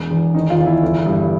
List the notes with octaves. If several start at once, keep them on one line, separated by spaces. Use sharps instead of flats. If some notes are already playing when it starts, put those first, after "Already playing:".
Already playing: E1
E2
D#3 D#4
F4
E2
E4
G1
G2